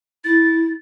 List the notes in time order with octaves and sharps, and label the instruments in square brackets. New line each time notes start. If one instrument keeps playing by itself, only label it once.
[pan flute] E4 [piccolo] A6